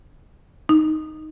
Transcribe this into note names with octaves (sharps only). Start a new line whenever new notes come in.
D#4